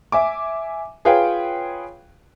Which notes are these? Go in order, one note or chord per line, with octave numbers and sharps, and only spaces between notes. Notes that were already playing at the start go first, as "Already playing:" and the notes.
E5 G#5 D6
F4 G#4 B4 C#5 F5 G5